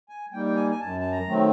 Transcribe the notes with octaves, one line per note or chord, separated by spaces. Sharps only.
G#5
G3 A#3 D#4 G5
G5
G#5
G#5
F#2 A5
A5
A#5
D#3 F#3 A3 C4